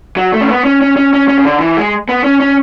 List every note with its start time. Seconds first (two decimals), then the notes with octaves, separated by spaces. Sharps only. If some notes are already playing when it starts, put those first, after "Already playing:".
0.17 F#3
0.34 A3
0.41 C#4
0.50 B3
0.65 C#4
0.81 C#4
0.97 C#4
1.13 C#4
1.28 C#4
1.39 C#3
1.45 D3
1.60 E3
1.77 G#3
2.09 B3
2.24 C#4
2.40 C#4